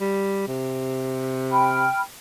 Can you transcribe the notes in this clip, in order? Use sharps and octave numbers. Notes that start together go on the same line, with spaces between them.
G3
C3
G5 B5 F6